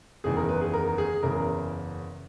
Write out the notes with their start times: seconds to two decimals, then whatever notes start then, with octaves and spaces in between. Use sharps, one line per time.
0.24 F#1 E2 D#3 G#4
0.37 A#4
0.49 B4
0.61 G#4
0.74 A#4
0.98 G#4
1.23 F#1 E2 C#3 A#4